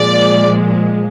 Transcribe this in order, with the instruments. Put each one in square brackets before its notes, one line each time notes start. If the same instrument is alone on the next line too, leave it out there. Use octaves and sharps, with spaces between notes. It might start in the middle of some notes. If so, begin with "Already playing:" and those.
Already playing: [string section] A#2 F3 G#3 D5